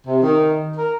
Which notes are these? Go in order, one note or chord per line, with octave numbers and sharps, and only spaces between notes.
C3
D#3
A#4